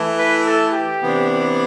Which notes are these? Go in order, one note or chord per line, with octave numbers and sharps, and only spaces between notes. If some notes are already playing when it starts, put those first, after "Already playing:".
Already playing: E3 A3 E4
B4
A4
G4
C3 E3 B3 D4